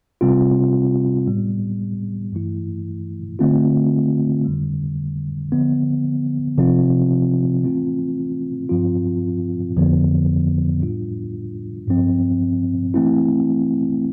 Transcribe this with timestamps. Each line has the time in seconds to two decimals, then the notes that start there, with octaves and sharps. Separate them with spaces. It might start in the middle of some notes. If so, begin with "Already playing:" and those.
0.21 C3 G3 C4 F4
1.27 A2 G3 B3
2.33 G2 E3 A3 E4
3.39 D3 A3 C4 F4
4.45 F2 D3 G3
5.52 D3 F3 B3
6.58 C3 F3 C4 F4
7.63 E3 A3 C4 F4
8.69 G2 F3 C4 F4
9.77 F2 D3 F3 B3
10.82 A2 G3 D4 F4
11.88 G2 F3 C4
12.94 E3 A3 C4 E4